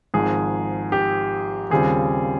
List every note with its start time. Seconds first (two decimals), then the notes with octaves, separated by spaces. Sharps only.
0.14 G#1 G#2 F3 G#4
0.92 G4
1.70 D#2 C#3 G3 C4 F4 G#4